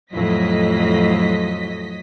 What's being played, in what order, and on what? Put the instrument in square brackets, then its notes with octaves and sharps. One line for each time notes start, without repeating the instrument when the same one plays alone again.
[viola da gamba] F2 A2 [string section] F#3 D#5 B6